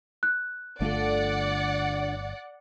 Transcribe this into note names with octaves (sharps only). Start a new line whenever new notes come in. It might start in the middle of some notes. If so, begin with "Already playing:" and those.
F#6
G1 D3 A3 F4 A4 D5 F#5